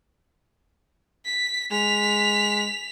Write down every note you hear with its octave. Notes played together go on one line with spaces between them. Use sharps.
B6
G#3 B6 F7